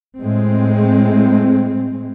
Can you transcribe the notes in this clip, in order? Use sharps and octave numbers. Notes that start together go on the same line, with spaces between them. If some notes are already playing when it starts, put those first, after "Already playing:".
A2 G#3 C4